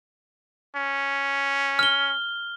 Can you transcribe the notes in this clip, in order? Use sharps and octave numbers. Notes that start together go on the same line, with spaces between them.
C#4
F6 G7